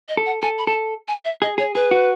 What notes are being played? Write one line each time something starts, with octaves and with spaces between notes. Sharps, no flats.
D#5
A4
F#5
A4 G#5
B5
A4 A5
G#5
E5
G#4 D#5
G#4 C#5
G#4 B4
F#4